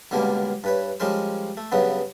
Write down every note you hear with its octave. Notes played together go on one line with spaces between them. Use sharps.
C#2 B2 D3 G3 A#3 A#4
G2 B4 C#5
F3 G3 G#3 C#4 A#4 C5
A3
G2 C#3 F#3 B3